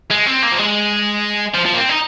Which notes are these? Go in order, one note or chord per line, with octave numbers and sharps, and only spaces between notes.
G#3
C4
A#3
F3
G#3
F3
F3
A#3
C4
D#4